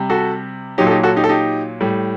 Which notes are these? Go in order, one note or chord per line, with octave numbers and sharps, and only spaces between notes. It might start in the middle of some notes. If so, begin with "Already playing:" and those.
Already playing: C3 G3
F#4 A4
A#2 F#3 D#4 G4
A4
D#4 G4
F#4 A4
D#4 G4
A4
D#4 G4
A2 G3